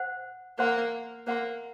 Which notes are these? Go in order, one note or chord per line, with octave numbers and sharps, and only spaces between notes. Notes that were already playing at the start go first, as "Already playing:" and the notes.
Already playing: C5 F#5
A#3 C5 F#5 C6
A#3 C5 F#5 C6